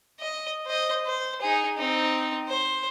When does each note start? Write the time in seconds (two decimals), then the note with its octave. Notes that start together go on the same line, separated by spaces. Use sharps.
0.19 D#5
0.66 C5 D#5
1.06 C5
1.41 D#4 G#4
1.77 C4 D#4
2.48 C5